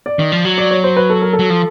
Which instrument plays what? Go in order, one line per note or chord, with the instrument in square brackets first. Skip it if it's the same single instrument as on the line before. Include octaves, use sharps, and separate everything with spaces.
[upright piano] D5
[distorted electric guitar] D#3
F3
F#3
[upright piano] D5
C#5
C5
B4
A4
A#4
A4
[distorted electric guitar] F#3
F3